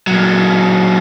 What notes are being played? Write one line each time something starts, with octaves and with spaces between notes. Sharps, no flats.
A#2 F#3